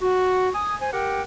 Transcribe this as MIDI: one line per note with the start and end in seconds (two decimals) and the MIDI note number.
0.01 0.49 66
0.54 0.75 80
0.54 0.75 87
0.81 0.91 72
0.81 0.91 80
0.92 1.21 67
0.92 1.21 70
0.92 1.21 78
0.92 1.21 79